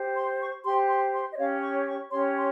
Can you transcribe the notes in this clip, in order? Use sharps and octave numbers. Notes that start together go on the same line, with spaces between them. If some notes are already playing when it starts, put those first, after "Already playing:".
Already playing: G4 C5
C6
C#6
G4 C5 C6
C6
C6
D#5
C#4 G4 C#5 F5
C#6
C#6
C#4 G4 C#5 C6
C6